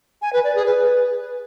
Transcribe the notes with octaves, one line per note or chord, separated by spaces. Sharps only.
G#5
B4
D5
G#4
B4